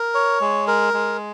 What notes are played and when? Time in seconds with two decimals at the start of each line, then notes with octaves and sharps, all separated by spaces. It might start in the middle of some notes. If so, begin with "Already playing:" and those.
Already playing: A#4
0.14 C#5
0.41 G#3
0.67 A#4
0.93 G#3